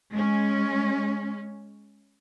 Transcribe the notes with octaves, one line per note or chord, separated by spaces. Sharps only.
G#3 C#4